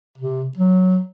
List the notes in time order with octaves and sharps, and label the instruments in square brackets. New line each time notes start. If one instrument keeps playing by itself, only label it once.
[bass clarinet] C3
F#3